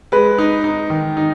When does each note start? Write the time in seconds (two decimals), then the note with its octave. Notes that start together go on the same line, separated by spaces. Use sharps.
0.12 G#3 B4
0.38 D#4
0.64 D#4
0.90 D#3
1.17 D#4